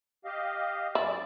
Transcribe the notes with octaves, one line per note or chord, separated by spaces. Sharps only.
G4 D#5 F5
F#2 E4 D5